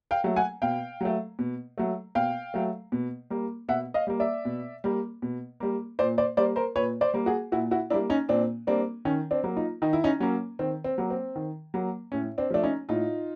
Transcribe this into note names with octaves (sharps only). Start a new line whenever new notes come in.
F5 G5
F#3 A3
F#5 G#5
B2 F5 G5
F#3 A3
B2
F#3 A3
B2 F5 G5
F#3 A3
B2
G3 A#3
B2 E5 F#5
D#5 F5
G3 A#3
D5 E5
B2
G3 A#3
B2
G3 A#3
A#2 C5 D5
C5 D5
G3 A#3 C5 D5
A#4 C5
A#2 B4 C#5
C5 D5
G3 A#3
F#4 G#4
A#2 E4 F#4
E4 F#4
G3 A#3 D4 E4
C#4 D#4
A#2 C4 D4
G3 A#3 C4 D4
D#3 C#4
C4 D4
F#3 A#3
D#4 F4
D#3 D#4
E4
C#4 D#4
F#3 A#3 C#4
D#3 C4
C4
F#3 A#3
C4
D#3
F#3 A#3
A2 C#4
C4 D4
F3 A3 D4
C#4 D#4
A2 D#4 F4